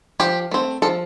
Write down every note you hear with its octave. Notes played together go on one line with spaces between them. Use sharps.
F3 G4
A3 C4
F3 A4